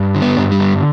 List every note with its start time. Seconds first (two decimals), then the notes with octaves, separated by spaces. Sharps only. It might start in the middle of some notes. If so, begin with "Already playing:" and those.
Already playing: G2
0.15 D3
0.22 B3
0.37 G2
0.52 G3
0.60 D3